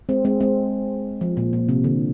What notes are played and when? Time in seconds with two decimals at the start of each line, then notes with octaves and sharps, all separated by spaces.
0.09 G#3 C4
0.25 G#3 C4
0.40 G#3 C4
1.21 F3
1.37 A#2
1.53 A#2
1.69 C3
1.84 D3